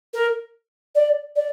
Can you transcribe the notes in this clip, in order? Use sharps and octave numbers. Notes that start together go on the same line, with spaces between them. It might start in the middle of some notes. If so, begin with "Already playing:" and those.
A#4
D5
D5